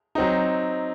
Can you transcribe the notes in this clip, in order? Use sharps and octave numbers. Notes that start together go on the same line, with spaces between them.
F#3 C4 D#4